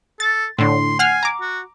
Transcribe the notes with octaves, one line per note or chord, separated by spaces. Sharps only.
A4 A6
A2 D3 C6
F#5 G#5 F6 C7
A#5 D6
F#4